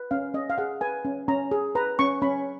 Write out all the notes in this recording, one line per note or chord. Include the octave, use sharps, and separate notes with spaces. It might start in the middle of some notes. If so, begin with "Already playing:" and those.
Already playing: B4
C#4 F5
C#4 D#5
F5
G#4 F#5
B4 G#5
C#4
C#4 A#5
G#4
B4 A#5
C#4 C#6
C#4 B5